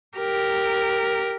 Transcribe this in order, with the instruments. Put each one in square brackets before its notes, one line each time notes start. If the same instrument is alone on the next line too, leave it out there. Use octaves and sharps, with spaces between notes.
[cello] G4 A#4